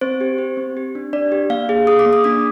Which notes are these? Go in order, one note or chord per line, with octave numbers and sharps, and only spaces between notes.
C4 C5
G4
G4
C4
G4
D4
D4 D5
G4
A#3 F5
G#4
G#4 D#6
D6
A#3
D#6
D4 D6